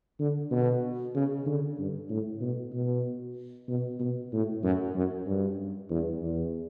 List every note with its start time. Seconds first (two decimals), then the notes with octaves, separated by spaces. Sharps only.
0.19 D3
0.51 B2
1.15 C#3
1.46 D3
1.79 G2
2.10 A2
2.41 B2
2.73 B2
3.68 B2
4.00 B2
4.32 A2
4.64 F#2
4.96 F#2
5.27 G2
5.91 E2
6.22 E2